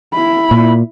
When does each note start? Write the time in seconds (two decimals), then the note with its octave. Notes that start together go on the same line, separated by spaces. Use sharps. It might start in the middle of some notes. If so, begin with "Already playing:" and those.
0.14 E4 B5
0.51 A#2